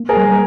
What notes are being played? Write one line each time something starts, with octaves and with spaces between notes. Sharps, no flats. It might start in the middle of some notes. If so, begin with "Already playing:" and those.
Already playing: A#3
G#4 A#4
G3